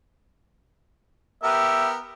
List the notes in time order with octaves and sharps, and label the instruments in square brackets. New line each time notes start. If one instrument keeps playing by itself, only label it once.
[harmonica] B3 G4 A#4 [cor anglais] E5